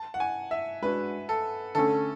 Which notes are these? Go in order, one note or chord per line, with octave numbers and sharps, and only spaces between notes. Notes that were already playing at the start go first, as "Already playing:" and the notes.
Already playing: A5
F#5
G#5
E5
G#3 D4 F#4 B4
A4
D3 A3 C#4 A4